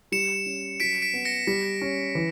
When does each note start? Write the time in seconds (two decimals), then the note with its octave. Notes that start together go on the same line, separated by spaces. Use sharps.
0.12 G3 C#7 E7
0.46 C#4
0.80 F#3 B6 D7
1.02 B6 D7
1.13 B3
1.25 A#6 C#7
1.47 G3 B6
1.81 C#4
2.15 E3